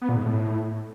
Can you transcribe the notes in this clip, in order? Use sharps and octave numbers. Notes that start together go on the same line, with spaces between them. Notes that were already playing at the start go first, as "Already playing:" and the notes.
B3
A#2
G#2
A2